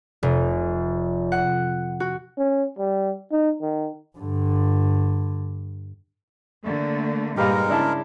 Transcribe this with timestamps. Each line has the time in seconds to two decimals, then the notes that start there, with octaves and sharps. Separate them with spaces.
0.23 F1
1.32 F#5
2.00 F#4
2.38 C#4
2.79 G3
3.32 D#4
3.62 D#3
4.17 G2 D3
6.64 D3 A3 A#3
7.37 G2 A#2 G#3 D#4 G4 A#4 B4 F5
7.69 C#3 D4 E4 A5